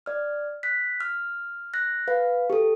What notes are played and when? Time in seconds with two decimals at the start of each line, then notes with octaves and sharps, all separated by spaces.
0.06 D5 F6
0.63 F#6 B6
1.00 F6
1.74 F#6 A#6
2.08 B4 F5
2.50 G4 A4